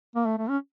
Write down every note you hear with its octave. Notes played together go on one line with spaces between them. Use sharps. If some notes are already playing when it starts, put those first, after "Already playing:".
A#3
A3
A3
C#4